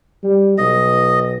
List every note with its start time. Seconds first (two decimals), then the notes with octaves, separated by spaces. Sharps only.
0.23 G3
0.58 B1 D#5